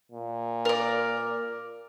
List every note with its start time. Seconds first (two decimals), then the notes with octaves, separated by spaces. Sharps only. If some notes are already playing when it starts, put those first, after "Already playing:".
0.12 A#2
0.65 A#4 D5